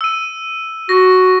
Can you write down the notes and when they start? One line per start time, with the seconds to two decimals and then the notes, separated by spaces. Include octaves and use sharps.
0.01 E6 D#7
0.89 F#4 A#6